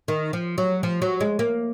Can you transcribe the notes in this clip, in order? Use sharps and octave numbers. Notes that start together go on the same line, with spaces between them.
D#3
F3
F#3
F3
F#3
G#3
A#3